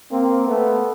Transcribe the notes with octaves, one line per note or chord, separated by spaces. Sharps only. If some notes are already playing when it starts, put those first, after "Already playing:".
A#3 C4
A3 B3